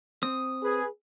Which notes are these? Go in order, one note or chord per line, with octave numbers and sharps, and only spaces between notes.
C4 D#6
G#4 B4